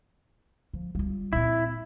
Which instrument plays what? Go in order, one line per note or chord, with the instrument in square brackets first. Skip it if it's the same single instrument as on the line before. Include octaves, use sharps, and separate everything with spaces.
[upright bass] F3
G3 F4
[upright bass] A#2 C4 [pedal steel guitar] E4